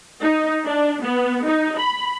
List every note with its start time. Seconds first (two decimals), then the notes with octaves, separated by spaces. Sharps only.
0.22 D#4
0.66 D4
1.03 B3
1.46 D#4
1.78 B5